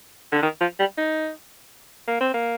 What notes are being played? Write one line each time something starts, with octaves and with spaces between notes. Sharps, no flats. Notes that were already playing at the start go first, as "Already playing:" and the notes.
D3
D#3
F3
G3
D#4
A#3
C4
A#3